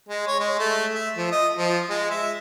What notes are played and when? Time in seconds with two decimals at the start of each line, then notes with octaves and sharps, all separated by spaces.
0.09 G#3
0.27 C#5
0.39 G#3
0.59 A3
0.95 E5
1.17 F3
1.31 D#5
1.58 F3
1.90 G#3
2.10 E5